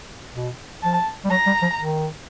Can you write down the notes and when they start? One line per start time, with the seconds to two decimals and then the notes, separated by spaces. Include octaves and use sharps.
0.35 B2
0.83 F3 A5
1.25 G3
1.30 F#3 A#5
1.47 G3
1.62 F3
1.79 D#3